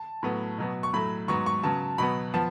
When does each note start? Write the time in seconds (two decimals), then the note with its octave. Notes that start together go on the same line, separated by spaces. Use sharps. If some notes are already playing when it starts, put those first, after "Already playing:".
Already playing: A5
0.23 A2 F#3 B3
0.58 B2 F#3 B3
0.83 C#6
0.93 A2 F#3 A3 B5
1.28 G#2 F#3 B3 C#6
1.46 C#6
1.63 C#3 F#3 B3 A5
1.98 B2 F#3 B3 B5
2.34 F3 B3 A5